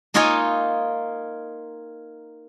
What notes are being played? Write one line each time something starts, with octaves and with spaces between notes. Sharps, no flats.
A#3 D#4 F4 C#5 D#5 G#5